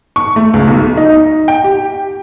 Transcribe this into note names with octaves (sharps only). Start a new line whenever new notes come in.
C#6
A3
C#2
B1
D#4
G5
G4